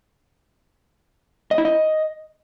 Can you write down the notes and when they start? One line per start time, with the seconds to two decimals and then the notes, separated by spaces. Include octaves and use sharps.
1.51 D#5
1.58 E4
1.65 D#5